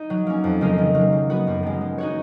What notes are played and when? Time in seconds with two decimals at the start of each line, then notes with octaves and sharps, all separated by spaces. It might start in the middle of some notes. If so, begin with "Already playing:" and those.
Already playing: D#4
0.10 F#3
0.27 A#3 C#4
0.44 F2
0.61 C#3 G#3 D#4 A#4
0.78 D#3
0.94 F#3 A#3
1.13 G#3
1.30 B3 F#4
1.47 F#2
1.63 D#3 G#3
1.81 G#3
1.98 D#4 F#4 C#5